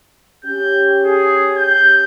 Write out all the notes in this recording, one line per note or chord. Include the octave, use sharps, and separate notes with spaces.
C#4 G4 G6
G#4
G6